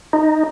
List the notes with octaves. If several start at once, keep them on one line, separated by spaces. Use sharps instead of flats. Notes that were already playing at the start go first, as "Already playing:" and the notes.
D#4